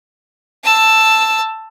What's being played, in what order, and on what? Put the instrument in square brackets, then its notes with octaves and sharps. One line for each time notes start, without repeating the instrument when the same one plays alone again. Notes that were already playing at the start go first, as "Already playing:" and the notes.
[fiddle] A5 E6